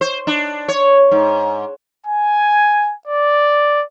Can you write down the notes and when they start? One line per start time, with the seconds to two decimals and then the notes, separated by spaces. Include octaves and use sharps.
0.01 C5
0.27 D4
0.68 C#5
1.11 G#2
2.05 G#5
3.07 D5